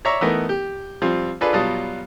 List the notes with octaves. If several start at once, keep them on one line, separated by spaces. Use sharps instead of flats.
C#5 D5 E5 A#5 C#6
E3 A3 B3 D#4 A#4
G4
F3 G3 C4 F4
D4 F4 G#4 A4 B4 D5
B2 F#3 G3 F4 A5 D#6